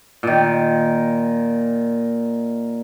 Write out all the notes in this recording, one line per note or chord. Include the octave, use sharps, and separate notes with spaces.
A#2 D#3